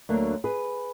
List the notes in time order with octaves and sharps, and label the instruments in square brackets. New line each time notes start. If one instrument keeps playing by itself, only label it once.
[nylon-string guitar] D2 D3 F#3 A#3 D4
G#4 B4